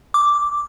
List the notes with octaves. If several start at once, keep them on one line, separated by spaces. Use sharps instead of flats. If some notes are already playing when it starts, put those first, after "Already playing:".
D6